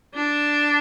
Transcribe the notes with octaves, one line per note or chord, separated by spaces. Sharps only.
D4